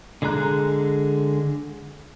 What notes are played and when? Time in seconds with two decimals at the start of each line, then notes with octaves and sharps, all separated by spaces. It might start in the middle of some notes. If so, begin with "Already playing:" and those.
0.22 D3 G#3 G#4 A#5 F#6